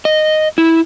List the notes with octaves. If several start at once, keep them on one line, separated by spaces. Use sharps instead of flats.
D#5
E4